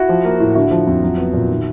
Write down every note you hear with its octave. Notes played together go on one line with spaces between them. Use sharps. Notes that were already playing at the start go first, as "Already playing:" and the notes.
Already playing: E4 F#4
F3
A#3
A2
D3 E4 F#4
F3
F2
F#3
B3
A#2
D#3